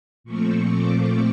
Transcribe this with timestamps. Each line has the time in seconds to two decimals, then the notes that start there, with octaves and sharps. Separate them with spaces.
0.24 A#2 F3 A3 C4 C#6
0.73 D6